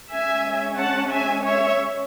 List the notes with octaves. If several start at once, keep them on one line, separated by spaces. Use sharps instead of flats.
G#3 C#4 E5 G#5
F#5 A5
E5 G#5
C#5 E5